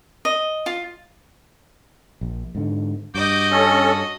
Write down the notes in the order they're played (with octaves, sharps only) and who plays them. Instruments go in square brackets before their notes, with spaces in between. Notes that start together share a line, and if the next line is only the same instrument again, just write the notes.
[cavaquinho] D#5
F4
[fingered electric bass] A#1
G#2 D3
[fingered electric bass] G2 [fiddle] F#4 D#5 [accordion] D6 G6
[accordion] C#4 A4